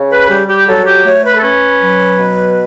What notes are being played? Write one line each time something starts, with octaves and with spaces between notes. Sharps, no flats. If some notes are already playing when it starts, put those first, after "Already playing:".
Already playing: C#3
B4
G3 G4
G4
F#3 A4
G4
A3 C#5
B4
A4
C#4 B4
F#3
B2